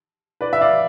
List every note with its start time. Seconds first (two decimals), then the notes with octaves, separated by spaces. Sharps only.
0.41 B4 D5
0.53 E5
0.61 D5 F5